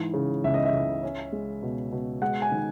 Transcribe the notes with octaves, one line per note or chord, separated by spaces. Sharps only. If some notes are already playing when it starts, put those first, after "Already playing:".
Already playing: G#2 E3
C#3
C#2 E5
D#5
E5
C#2
C#4
G#3
B2
B2
G#3 F#5
G#5
D#3